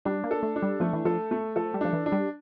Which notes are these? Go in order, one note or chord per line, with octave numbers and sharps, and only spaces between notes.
G3 D4
A#3
A4
A3
D4
G3
F3 A3
E3
F3 A4
A3
F3 A4
G3
F3 D4
E3
D4
G3